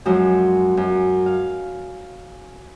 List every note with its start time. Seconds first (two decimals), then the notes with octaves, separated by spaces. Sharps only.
0.05 F#2 F3 F#3 G#3
0.77 F#2
1.26 F5